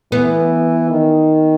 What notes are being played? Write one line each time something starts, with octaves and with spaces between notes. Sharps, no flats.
E3 B3
D#3